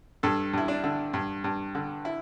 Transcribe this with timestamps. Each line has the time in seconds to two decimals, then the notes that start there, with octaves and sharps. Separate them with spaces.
0.23 G2 A4
0.53 G2 E4
0.68 D4
0.84 D3
1.14 G2
1.44 G2
1.75 D3
2.05 E4